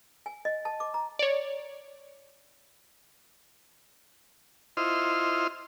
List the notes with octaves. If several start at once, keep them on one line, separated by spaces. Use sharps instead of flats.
G#5
D#5
A5
D6
A#5
C#5 D5
E4 F4 C5 D#5 C6 F6